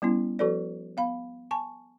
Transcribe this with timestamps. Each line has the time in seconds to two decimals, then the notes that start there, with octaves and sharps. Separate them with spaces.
0.02 G3 B3 C#4 E4
0.39 F3 F#4 A4 B4 D5
0.97 B3 F5 B5
1.51 G#5 A5 C#6